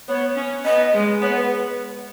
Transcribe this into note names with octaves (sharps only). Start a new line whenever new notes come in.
B3 C#5
C#4
B3 D#5
G#3
B3 C#5
B4